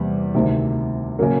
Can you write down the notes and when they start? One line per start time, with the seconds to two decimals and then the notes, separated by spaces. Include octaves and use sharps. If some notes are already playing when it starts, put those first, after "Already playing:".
Already playing: E2 C3 G3 B3
0.34 D2 C3 D#3
1.19 C#3 F#3 A#3